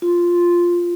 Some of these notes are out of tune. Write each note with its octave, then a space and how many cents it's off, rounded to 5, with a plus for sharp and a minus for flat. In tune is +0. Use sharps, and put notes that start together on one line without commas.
F4 +0